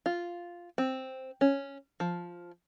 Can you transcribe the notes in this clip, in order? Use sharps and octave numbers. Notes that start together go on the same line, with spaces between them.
F4
C4
C#4
F3